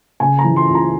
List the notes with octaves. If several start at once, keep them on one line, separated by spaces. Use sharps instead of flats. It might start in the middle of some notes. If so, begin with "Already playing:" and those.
C#3 G#5
A#5
E3
C6
C#2
A#5